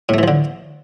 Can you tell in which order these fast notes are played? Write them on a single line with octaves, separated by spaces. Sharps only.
A2 A3 E3 F3 D3